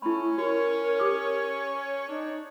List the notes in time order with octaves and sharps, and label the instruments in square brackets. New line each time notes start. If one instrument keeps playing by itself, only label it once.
[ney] A3 [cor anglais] C#4 [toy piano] E4 B5
[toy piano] F#4 [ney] A#4 [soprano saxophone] C#5
[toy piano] G4 D6 D#6
[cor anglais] D4 [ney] D#4